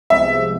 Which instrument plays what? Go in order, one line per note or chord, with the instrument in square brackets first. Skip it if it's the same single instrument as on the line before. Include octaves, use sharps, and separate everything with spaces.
[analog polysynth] C2 C3 F3 G#3 B3 [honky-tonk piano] E5